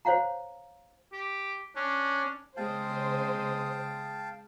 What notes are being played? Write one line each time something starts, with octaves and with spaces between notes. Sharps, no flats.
C5 C#5 F5 F#5 A#5
G4
C#4 D4
C#3 G#3 C5 F5 G5 A5 D#6